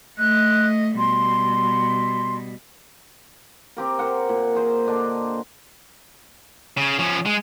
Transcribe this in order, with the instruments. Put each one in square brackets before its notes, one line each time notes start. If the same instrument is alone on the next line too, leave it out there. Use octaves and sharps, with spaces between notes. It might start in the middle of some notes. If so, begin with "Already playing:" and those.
[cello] A3 D#5 [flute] F#6
[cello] B2 G3 [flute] C6
[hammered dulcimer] C4 G4 A#4
A#4 C5 F#5
A#2
G#4 A#4 C5
D3 D4 D#5
[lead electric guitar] C#3
F3 C#4
G#3